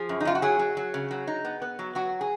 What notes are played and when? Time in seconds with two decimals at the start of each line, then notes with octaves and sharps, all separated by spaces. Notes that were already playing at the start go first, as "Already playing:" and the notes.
Already playing: F3 G#4
0.09 F#2
0.20 D#4
0.25 F#2 F4
0.35 F#4
0.42 F#3 G#4
0.59 F#3
0.77 F#3
0.94 C#3
1.11 F#3
1.27 D#4
1.45 B3
1.62 B3
1.79 F#3
1.95 F#3 F#4
2.21 G#4